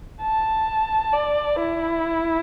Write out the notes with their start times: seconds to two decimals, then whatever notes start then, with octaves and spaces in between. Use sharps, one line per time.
0.22 A5
1.13 D5
1.59 E4